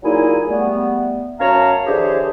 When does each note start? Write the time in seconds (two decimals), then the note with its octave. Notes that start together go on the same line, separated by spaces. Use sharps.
0.03 A#2 F#3 D#4 E4 G#4 G#5
0.49 G3 A3 B3
1.39 F#2 C#4 C#5 F5 A5 A#5
1.85 D3 E3 G4 G#4 C5 C#5